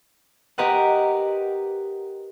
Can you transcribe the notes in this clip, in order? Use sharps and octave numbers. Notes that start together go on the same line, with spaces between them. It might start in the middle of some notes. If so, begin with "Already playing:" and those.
G4 A#4 B4 D#5 F#5